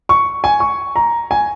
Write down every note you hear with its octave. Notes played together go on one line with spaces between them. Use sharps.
C#6
G#5
C#6
A#5
G#5